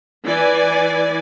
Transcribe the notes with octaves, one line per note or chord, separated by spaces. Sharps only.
E3 D5 G#5